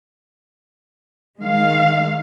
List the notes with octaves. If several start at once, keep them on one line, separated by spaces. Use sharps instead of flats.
D#3 G#3 F5